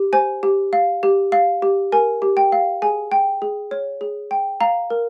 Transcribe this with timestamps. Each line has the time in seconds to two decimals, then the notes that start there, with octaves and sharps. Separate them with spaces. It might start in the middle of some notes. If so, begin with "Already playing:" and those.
Already playing: G4
0.13 C5 G#5
0.43 G4
0.73 F5
1.03 G4
1.32 F5
1.62 G4
1.92 A#4 G#5
2.22 G4
2.37 G5
2.52 F5
2.82 G#4 G#5
3.12 G5
3.42 G#4
3.71 C#5
4.01 G#4
4.31 G5
4.61 F5 A#5
4.90 A#4